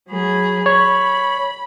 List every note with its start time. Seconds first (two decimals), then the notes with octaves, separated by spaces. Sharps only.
0.10 F#3 G#4 B5
0.66 C#5 B5